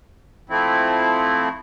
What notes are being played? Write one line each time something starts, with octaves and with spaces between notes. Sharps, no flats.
F3 A3 C4 E4